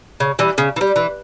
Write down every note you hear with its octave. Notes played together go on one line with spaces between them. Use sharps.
C#3
E3 G3
C#3
E3
G3
E3